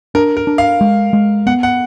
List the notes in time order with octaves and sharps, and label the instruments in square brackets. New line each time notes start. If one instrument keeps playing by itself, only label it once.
[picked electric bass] D4 [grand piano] A#4
[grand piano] A#4
[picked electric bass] D4
[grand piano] F5
[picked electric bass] G#3
G#3
[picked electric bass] B3 [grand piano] F#5
[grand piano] F#5